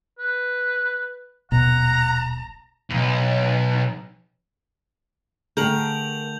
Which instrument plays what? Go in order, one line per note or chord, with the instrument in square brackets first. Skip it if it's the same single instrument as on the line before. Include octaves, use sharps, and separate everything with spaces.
[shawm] B4
[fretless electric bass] D#1 B1 B2 [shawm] F#5 [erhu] A#5
[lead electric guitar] B1 E2
[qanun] D3 A3 G#4 [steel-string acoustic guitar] A#4 G5 [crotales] G6 F7 F#7